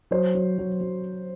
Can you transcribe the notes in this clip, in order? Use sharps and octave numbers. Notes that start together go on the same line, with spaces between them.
F#3 C5
F#3
F#3
F#3